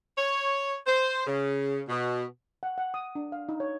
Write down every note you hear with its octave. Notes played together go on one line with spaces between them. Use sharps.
C#5
C5
C#3
B2
F#5
F#5
D#6
D4
F5
D#4
C#5